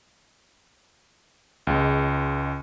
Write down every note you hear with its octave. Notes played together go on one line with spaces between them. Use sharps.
C#2 G#3